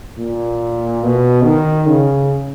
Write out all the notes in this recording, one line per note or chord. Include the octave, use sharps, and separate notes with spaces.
A#2
B2
D#3
C#3